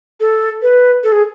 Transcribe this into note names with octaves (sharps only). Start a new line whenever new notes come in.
A4
B4
A4
G#4